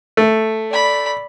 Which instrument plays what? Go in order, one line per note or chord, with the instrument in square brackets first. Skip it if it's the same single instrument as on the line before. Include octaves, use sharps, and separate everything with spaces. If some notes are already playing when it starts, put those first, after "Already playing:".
[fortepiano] A3
[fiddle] D5 B5